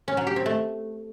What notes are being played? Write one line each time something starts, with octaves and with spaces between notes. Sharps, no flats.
C#4
F#3
G4
C4
A3